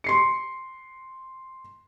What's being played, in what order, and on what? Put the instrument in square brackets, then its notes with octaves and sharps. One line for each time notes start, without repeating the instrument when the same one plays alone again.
[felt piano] C6 C7 C#7